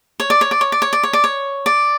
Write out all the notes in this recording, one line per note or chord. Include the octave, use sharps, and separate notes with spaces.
C#5
D5
C#5
D5
C#5
D5
C#5
D5
C#5
D5
C#5
D5